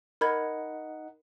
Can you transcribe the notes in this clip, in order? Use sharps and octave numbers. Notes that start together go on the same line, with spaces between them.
D#4 A#4 D#5 F#5 B5 G#6